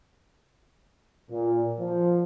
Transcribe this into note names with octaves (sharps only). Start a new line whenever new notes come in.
A#2
F3